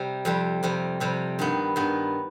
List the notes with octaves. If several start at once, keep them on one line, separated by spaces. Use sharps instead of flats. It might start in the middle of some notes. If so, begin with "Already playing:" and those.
Already playing: C3 G3
F2 C3 G3
F2 C3 G3
F2 C3 G3
G2 D#3 B3
G2 D#3 B3